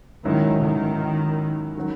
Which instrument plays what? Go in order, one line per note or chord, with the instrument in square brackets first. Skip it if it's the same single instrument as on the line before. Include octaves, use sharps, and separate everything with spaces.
[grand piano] G#2 F#3 C#4 E4 [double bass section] D#3
[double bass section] D#3
[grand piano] D#3 F#3